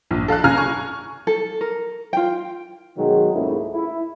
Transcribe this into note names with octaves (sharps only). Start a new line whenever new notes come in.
A#1
A4 F5 A5 F#6
F#1 C#3 F5 G#5 A#5 F6
G#5 C#6
A4
A#4
F4 G5
B2 D#3 F#3 G#3
C#2 G#2 C#3 A3 A#3 E4
E4